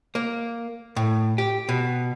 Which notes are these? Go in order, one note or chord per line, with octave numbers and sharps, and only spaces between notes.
A#3
A2
G4
B2